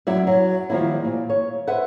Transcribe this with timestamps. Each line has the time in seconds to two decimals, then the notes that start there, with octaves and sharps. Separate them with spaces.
0.07 F#2 F#3 E4 F#4 D5 E5
0.27 F#3
0.70 D#3 F3 G3 A#3 E4
1.05 A#2
1.30 C#5
1.68 B4 C5 E5 F#5